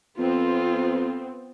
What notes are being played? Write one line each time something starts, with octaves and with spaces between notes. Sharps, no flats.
F2 B3 C4 F4